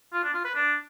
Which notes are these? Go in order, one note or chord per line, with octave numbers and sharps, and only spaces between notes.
F4
D4
F4
B4
D4